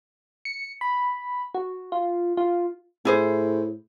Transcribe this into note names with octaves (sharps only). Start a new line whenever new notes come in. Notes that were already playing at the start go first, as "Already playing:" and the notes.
C#7
B5
F#4
F4
F4
A2 E4 G#4 C5